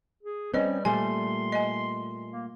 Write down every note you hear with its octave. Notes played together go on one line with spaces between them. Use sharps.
G#4
G3 C4 C#4 B4 D#5
A#2 G3 A3 G#5 C6
D#5 G#5
A#3